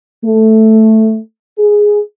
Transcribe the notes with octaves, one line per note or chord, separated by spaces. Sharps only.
A3
G#4